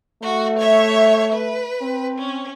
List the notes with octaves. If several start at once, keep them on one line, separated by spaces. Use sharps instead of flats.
A3 F#4
C#5 E5
B4
C4
C#4